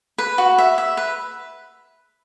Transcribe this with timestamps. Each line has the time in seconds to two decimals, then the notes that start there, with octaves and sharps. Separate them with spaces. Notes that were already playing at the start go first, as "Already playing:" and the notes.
0.18 B4
0.38 F#4
0.58 E5
0.78 E5
0.97 B4